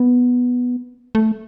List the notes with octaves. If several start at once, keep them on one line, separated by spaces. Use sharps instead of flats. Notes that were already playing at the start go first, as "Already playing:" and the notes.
Already playing: B3
A3